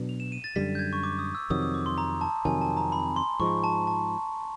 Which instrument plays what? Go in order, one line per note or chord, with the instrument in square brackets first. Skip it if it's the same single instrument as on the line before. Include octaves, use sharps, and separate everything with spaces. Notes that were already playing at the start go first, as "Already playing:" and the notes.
Already playing: [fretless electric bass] B2 F#3 B3 D4
[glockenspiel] F7
E7
D#7
A6
[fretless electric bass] F#2 D3 G3 [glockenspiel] B6
[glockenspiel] G6
G#6
C#6
D6
D#6
E6
[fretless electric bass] F2 C3 D#3 F#3 [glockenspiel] D#6
[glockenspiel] D#6
D6
C6
A#5
A5
[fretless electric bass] F2 C3 D#3 F#3 [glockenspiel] G#5
[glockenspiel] A5
A#5
B5
C6
[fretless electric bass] G#2 F3 G#3 [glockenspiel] C#6
[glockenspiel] A5
A5